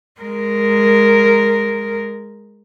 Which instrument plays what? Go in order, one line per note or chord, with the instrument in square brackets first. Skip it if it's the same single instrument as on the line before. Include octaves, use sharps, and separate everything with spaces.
[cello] G#3 A#4